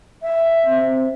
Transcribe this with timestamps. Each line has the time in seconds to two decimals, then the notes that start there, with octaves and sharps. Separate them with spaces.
0.22 E5
0.66 C4